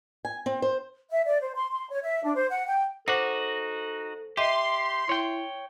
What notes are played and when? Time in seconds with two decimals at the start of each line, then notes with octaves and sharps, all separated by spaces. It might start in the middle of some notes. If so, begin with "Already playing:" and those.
0.25 G#5
0.46 C4
0.62 C5
1.11 E5
1.26 D5
1.40 C5
1.55 C6
1.70 C6
1.90 C#5
2.03 E5
2.23 D4
2.35 C5
2.51 F#5
2.67 G5
3.08 D#4 F#4 A4 C5 F#5 D6
4.37 G4 D#5 E5 C6
5.09 E4 C#5 G5